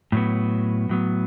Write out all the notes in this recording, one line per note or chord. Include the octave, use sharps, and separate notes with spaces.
A2 F#3 B3
A2 F#3 B3